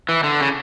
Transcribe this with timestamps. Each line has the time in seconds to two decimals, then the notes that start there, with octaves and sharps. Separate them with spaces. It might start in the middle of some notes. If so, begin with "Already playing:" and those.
0.09 E3
0.24 D3
0.41 C#3